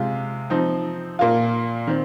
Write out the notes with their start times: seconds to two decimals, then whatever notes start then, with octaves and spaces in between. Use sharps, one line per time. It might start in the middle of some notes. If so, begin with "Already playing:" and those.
Already playing: C3 G#3 F4
0.50 F3 C4 D#4
1.19 A#2 A#3 F4
1.87 D#3 C4